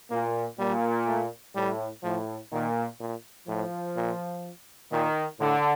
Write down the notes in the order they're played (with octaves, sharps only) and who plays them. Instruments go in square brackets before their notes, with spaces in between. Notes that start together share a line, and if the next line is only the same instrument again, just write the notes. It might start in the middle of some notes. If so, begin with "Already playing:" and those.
[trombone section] A#2 [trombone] A#3
[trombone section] A#2 [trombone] G3
[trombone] A3
[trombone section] A2 [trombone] G3
[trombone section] A2 [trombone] F3
[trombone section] A#2 [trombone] D#3
[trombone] A#2
[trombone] A2 [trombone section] F3
[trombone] A#2
[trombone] A#2 [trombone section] D#3
[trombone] A2 [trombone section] D3